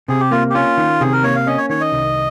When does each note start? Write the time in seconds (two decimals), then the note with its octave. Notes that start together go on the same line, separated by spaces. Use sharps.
0.08 C3 G#4
0.20 G4
0.31 A#3 F4
0.50 G4
0.54 C#4 F4
0.77 D#3
1.01 C3 G#4
1.13 A#4
1.24 A#3 C#5
1.36 F5
1.47 C#4 D#5
1.58 C#5
1.69 D#3 C#5
1.81 D#5
1.92 C2